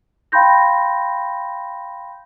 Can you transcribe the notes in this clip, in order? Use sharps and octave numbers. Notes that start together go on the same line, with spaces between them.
F5 G5 B5 C6 G6 A#6